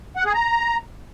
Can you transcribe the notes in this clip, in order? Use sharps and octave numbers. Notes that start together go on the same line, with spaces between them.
F#5
G#4
A#5